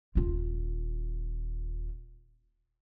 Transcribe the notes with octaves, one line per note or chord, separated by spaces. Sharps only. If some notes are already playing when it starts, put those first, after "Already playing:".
D#1 F4